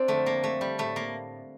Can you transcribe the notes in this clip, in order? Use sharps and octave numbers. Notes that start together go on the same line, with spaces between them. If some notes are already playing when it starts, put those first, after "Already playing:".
Already playing: C4 D4
F2 D3 A3
A#3
A3
G3
A2 A3
A#3